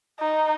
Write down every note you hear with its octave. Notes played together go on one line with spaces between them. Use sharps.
D#4